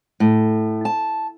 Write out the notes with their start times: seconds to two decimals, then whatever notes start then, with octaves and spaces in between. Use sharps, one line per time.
0.20 A2
0.85 A5